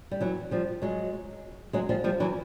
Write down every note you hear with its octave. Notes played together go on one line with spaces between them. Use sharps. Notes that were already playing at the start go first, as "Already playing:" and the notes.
G3
E3 F#3
F3 G3
F#3 G#3
F#3 G#3
F3 G3
F3 G3
E3 F#3